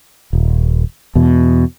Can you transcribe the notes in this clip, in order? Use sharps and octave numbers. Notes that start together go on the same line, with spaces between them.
D#1
E2 B2